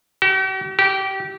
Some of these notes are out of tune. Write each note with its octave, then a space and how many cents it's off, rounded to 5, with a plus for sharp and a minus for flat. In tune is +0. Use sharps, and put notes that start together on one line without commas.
G4 -45
G4 -20